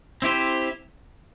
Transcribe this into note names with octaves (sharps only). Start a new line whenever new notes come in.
C4 E4 G4 C5